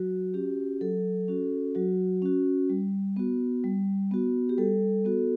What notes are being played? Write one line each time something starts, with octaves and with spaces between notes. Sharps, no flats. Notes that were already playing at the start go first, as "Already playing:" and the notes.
Already playing: F#3 F#4
C#4 F#4 G4
F#3 A4
C#4 F#4
F#3 F#4
C#4 F#4
G3
B3 F#4
G3
B3 F#4
G4
G3 A4
B3 F#4